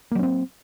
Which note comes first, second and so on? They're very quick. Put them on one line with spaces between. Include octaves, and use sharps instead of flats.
A#3 F#3 C#4 C4